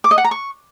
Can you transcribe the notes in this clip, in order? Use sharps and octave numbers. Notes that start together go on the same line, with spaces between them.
D6
D#5
F#5
A#5
C#6